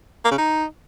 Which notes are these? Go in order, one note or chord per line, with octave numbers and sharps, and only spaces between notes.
A#3
C#3
D#4